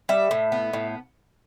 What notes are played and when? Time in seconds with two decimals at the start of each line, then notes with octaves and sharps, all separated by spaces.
0.09 G3 E5
0.31 A2
0.52 B3
0.73 A2